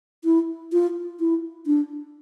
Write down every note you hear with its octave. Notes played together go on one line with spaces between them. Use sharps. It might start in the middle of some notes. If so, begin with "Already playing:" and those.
E4
F4
E4
D4